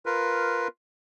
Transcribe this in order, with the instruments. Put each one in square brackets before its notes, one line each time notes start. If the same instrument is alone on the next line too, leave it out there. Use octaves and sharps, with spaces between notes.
[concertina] F4 A#4 B4